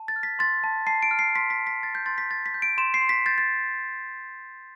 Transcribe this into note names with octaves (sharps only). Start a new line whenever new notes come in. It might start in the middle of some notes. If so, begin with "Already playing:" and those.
Already playing: A5
A6
F6
B6
C6 A6
A5
A5 C7
D7
F6
C7
C6 B6
B6
A5
B6
C6 A6
G6
C6 A6
B6
G6 A6
B6
G6
D7
C6 E7
C7
C6
B6
G6 A6
A6